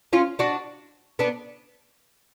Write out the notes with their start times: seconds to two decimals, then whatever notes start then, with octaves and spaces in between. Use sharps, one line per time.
0.13 C#4 F4
0.39 D4 F#4
1.19 B3 D4